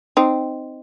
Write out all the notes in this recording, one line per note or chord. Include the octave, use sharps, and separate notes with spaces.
C4 D#4